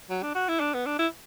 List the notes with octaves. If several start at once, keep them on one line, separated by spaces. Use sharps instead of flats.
F#3
D4
F#4
E4
D4
B3
D4
E4